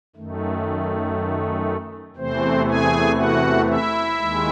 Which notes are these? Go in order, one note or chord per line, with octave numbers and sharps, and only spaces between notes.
F#2 D#3 A3
E2 C3 E3 A3 C4 C5
G#4 G#5
F#4 F#5
E4 E5
D#2 D#3 G#3